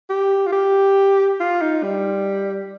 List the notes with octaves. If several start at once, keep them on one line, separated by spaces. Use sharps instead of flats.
G4
F4
G4
F4
D#4
G3